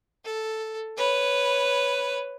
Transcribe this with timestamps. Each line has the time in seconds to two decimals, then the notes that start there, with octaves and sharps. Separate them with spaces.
0.25 A4
0.97 B4 C#5